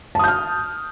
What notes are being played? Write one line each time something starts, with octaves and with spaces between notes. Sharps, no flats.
A5 D#6 F6 G6